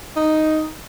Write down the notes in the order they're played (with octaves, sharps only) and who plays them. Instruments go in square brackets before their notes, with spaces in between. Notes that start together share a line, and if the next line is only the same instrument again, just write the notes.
[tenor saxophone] D#4